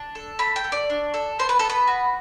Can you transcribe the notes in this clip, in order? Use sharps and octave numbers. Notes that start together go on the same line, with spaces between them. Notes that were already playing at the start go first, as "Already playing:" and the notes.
Already playing: D4
A4
A3 B5
G5
A3
D5
D4
A4
B3 C5
B4
B3 A4
B4
F#4